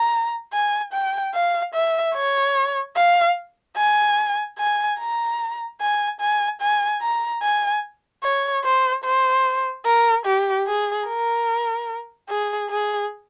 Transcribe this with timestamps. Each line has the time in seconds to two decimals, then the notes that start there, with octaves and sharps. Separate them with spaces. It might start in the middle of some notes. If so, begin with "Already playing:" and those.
Already playing: A#5
0.53 G#5
0.93 G5
1.35 F5
1.74 E5
2.15 C#5
2.96 F5
3.77 G#5
4.59 G#5
5.00 A#5
5.81 G#5
6.21 G#5
6.61 G#5
7.02 A#5
7.43 G#5
8.23 C#5
8.64 C5
9.05 C5
9.86 A#4
10.26 G4
10.67 G#4
11.08 A#4
12.29 G#4
12.70 G#4